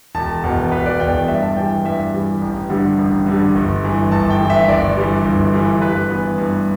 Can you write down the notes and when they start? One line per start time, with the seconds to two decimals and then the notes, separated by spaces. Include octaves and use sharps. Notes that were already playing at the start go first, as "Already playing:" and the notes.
0.15 E1 A5
0.44 E2 B2
0.71 E1 B4
0.86 D5
1.00 E2 B2 G5
1.14 D5
1.28 G2 E5
1.43 A5
1.56 E3 G3 G5
1.85 G2 E5
2.14 E3 G3
2.42 A1
2.70 G2 D3 G3
2.98 A1
3.26 G2 D3 G3
3.55 G1
3.84 G2 E3
4.12 G1 A5
4.30 G5
4.40 G2 E3
4.50 E5
4.68 G1 D5
4.97 G2 E3 G3
5.25 G1
5.53 G2 E3 G3
5.82 G2 B4
6.10 E3 B3
6.38 G2